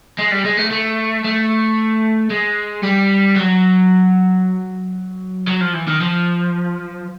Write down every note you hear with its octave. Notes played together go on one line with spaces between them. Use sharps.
G#3
G3
G#3
A3
A3
A3
G#3
G3
F#3
F#3
F3
E3
D#3
F3